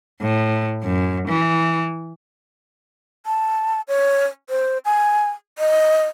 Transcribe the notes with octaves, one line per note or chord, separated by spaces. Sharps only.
A2
F#2
E3
A5
C#5
C5
G#5
D#5